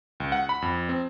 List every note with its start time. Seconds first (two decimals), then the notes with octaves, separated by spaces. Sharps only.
0.20 C#2
0.32 F#5
0.49 B5
0.62 F2
0.89 C4